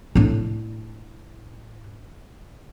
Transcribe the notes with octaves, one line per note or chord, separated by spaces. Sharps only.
A2 D4